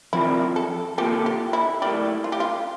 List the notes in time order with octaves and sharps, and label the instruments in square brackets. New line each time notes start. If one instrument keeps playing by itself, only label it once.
[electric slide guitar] F3 C4 F4 A#4 D5 [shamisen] E4
[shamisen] A4
[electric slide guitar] A#3 F4 A4 [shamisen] G4
[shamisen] G4
E4
[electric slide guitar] A3 E4 A#4 D5 [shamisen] G4
[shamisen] F4
G4
F4